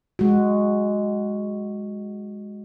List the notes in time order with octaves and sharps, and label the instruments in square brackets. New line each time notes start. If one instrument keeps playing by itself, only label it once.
[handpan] G#3 F#4